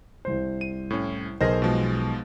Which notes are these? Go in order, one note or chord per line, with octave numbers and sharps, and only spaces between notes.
C2 C5
D#7
A2 C#4
B1 G#4 A#4 C5 D#5 A#6
B2 F3 G#3